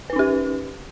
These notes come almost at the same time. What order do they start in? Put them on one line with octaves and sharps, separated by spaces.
B4 D#4 C#4 G4